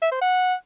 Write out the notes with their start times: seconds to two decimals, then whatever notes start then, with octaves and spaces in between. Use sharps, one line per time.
0.02 E5
0.12 C5
0.21 F#5